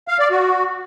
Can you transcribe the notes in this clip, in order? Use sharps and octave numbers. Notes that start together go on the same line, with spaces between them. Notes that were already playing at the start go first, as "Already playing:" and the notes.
F5
D5
F#4